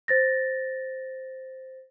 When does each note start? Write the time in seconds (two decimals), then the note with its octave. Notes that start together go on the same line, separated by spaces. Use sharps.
0.08 C5 A6 A#6